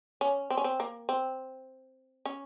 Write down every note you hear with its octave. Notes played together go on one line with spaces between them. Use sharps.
C#4
C4
C#4
C4
A#3
C4
C#4